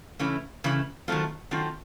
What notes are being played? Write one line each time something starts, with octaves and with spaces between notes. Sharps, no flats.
C#3 E3 A3 C#4 E4
C#3 E3 A3 C#4 E4
D#3 F#3 A3 C4 F4
D#3 F#3 A3 C4 F4